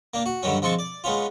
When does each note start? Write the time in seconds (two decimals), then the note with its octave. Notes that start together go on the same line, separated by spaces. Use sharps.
0.14 A#3 D4
0.26 F#4
0.43 G2 D3 D#3 F#3 C#4
0.62 F3 G#3 C4 A5 C#6
0.79 D5
1.04 G#3 B3 C#4 F4